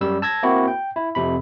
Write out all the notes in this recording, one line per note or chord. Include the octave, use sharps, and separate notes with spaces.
F#2 G3 E6
A5 E6 G#6 A#6
A#3 C4 E4 F#4
G5
E4
F2 C3 B5